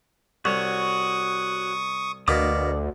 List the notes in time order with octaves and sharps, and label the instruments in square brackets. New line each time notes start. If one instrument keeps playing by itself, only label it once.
[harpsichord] C2 [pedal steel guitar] F#4 C#5 [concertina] C#6 D#6
[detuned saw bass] D2 [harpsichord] B2 A#3 [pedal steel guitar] D5 D6 D#6